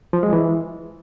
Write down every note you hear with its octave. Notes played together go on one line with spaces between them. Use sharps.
F3
G#3
E3